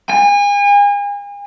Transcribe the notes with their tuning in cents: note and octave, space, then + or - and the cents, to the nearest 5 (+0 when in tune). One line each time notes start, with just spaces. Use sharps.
G#5 -35